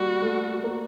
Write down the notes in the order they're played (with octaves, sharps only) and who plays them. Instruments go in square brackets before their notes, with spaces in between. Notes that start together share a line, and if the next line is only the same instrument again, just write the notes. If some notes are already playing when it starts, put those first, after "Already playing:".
Already playing: [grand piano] G3 A#3 [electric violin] F#4
[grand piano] A3
A#3